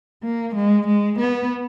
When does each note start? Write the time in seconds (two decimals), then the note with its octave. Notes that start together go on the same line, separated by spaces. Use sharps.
0.24 A#3
0.55 G#3
0.87 G#3
1.19 B3